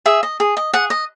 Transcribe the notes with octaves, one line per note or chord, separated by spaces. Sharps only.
G#4 E5
D#5
G#4
D#5
G#4 F#5
D#5